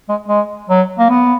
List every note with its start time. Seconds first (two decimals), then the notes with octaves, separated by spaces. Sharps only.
0.09 G#3
0.28 G#3
0.69 F#3
0.98 A#3
1.09 B3